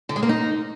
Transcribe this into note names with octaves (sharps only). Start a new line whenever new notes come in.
D3
G#3
A#3
D#4